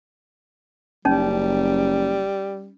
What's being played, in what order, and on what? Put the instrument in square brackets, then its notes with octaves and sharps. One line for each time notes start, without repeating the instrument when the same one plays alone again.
[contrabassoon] F#1 [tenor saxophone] G3 [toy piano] C#4 D#4